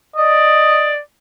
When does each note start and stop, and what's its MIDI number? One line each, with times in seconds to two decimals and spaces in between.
0.16 1.01 74
0.16 0.90 75